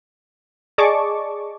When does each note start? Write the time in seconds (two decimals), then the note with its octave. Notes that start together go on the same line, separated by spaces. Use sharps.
0.78 G#4 D5 D#5 A5 C#6 D6